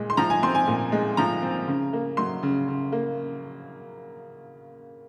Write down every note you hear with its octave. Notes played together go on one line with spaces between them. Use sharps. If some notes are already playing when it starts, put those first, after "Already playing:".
Already playing: A#2 G#3
C6
F3 A#5
G#5
C4 C6
G#5
A#2
G#3
F3 A#5
C4
C#3
A#3
F#3 C6
C#3
C#3
A#3